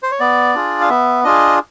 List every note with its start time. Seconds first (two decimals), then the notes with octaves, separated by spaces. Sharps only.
0.03 C5
0.11 C#5
0.20 B3 D5
0.55 D4 F4 G#4
0.81 F5
0.89 B3 E5
1.24 D4 F4 G#4 D#5